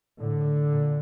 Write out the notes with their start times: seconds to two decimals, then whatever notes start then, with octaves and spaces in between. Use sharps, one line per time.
0.20 A2 D3
0.70 A#2